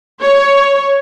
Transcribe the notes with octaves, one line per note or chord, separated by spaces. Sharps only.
C#5